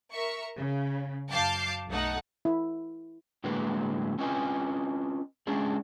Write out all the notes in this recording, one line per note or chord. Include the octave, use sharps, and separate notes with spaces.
A#4 E5 C#6
C#3
F#2 F5 A5 D6 G6 C7
B1 A3 D#4 A4 F#5
E4
A2 D3 F#3 G#3 A#3 B4
C4 C#4 F4 B4 D#5 G#5
G#3 C#4 D4 G#4